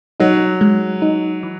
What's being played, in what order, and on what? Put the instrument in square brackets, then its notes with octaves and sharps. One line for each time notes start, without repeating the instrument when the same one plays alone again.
[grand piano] F#3 [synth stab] D#4
[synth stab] G#3
D#4
E3